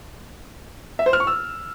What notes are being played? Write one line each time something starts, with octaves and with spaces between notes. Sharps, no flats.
E5
C5
F6
C#6
E6